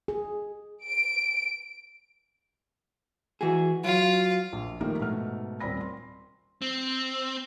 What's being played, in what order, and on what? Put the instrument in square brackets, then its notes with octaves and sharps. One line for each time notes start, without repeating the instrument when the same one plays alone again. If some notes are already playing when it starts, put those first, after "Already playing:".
[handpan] G#4
[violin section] D7
[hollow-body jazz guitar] E3 F#4 G#4
[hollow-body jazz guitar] F#3 [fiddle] F4
[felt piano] A#1
D#3 F3 G3 A3 A#3 D#4
G#2 B2 A3 F6
D#1 C4 D5 B5 A#6
C6
[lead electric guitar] C4